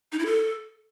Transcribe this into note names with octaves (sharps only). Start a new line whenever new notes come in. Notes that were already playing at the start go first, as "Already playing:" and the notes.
D#4
E4
A4